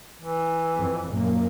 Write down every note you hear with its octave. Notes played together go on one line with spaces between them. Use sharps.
E3
F2
F#2 A#2 A#3